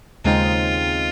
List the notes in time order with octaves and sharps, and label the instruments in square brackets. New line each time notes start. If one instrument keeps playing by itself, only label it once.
[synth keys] D#2 C#3 G#3 C4 D#4 [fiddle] F4